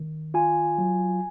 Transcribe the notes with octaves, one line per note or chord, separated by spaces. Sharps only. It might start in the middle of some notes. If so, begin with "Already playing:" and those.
Already playing: D#3
F4 G#5
F#3